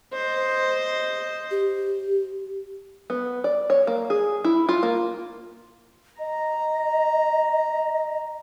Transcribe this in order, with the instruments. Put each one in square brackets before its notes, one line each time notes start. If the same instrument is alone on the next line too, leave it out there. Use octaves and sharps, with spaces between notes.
[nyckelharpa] C5 D#5
[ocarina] G4
[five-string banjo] B3
D5
C#5
A#3
G#4
E4
F4
A#3
[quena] D#5 [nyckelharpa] A#5